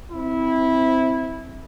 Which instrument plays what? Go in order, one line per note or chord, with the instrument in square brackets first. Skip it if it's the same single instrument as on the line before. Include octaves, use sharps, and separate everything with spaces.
[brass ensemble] C4 E4